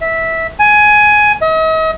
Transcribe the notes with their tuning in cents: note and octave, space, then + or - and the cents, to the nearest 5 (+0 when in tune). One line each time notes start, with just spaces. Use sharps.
E5 -10
G#5 +15
D#5 +45